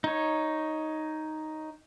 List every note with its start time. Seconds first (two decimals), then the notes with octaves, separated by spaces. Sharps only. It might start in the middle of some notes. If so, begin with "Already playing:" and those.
0.04 D#4 C#5